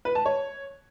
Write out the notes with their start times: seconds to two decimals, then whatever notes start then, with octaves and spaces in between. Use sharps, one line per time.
0.05 B4
0.15 A5
0.26 C#5